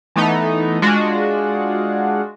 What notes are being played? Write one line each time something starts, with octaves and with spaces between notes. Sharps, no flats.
E3 A3 B3 D#4
G#3 D4 F4 F#4